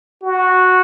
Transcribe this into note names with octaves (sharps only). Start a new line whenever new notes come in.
F#4